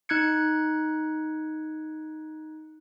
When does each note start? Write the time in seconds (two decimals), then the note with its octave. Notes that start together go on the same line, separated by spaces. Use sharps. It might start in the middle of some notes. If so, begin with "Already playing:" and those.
0.09 D#4 F#6 G#6 C#7